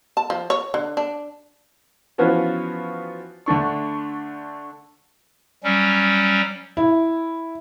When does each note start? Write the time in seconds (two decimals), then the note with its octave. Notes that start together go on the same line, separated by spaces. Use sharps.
0.17 A5
0.30 F3
0.50 C#5
0.74 D3
0.97 D4
2.18 E3 F3 B3 C#4 F4 F#4
3.46 D3 A3 D4 C#6
5.64 F#3 G3 C#4
6.77 E4